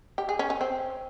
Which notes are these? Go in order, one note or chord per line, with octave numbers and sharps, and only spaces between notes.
G4
G#4
C#4
C#4
C4